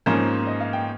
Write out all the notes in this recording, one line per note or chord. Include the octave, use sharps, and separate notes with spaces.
G#2 F3 A#3 C#4 C5
D#5
F5
G5